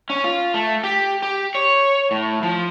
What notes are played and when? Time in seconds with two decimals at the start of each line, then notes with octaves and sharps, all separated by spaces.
0.10 C#4
0.24 F4
0.54 A3
0.84 G4
1.23 G4
1.55 C#5
2.11 A2
2.43 F3